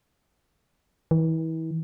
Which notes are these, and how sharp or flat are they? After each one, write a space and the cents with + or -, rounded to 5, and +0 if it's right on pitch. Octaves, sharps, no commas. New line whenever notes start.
E3 -35